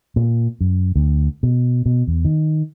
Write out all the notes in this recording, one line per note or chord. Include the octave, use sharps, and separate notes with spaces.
A#2
F#2
D2
B2
B2
E2
D#3